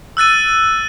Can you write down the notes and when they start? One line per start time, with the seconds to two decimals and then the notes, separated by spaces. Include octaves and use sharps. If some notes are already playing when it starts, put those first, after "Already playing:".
0.17 E6 F#6 A6 D#7